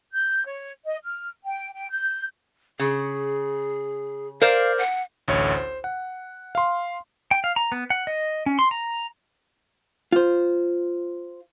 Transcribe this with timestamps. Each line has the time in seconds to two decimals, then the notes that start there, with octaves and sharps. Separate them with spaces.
0.12 G6
0.46 C#5
0.85 D#5
1.03 F6
1.44 G5
1.73 G5
1.89 G6
2.79 C#3 G#4
4.42 A#4 C5 D5 F5
4.78 F#5
5.28 A1 D2 C#5
5.55 C5
5.84 F#5
6.55 F5 C6
7.31 G5
7.44 F5
7.56 A#5
7.72 B3
7.90 F#5
8.07 D#5
8.46 C#4
8.59 C6
8.71 A#5
10.12 F4 C5